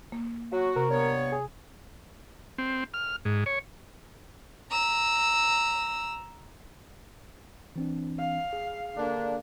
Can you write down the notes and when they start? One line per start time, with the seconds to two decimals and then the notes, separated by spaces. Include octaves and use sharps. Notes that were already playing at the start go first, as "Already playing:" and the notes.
0.12 A#3
0.52 F#3 F#4
0.76 C3 A#4
0.90 G2 B3 C#5
1.32 G#4
2.58 C4
2.94 F6
3.25 G#2
3.46 C#5
4.71 A#5 E6
7.76 E3 C4 D4
8.19 F5
8.53 G#4
8.96 D3 A#3 D4